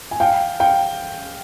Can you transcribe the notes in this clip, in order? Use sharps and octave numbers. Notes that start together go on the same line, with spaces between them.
G#5
F5 G5
F5 G5